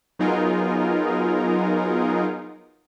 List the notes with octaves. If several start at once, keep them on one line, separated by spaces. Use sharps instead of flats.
F#3 B3 D#4 F4 G#4 A#4